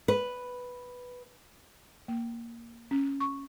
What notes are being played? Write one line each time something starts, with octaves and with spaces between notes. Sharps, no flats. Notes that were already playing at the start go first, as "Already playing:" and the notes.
B4
A#3
C#4
C#6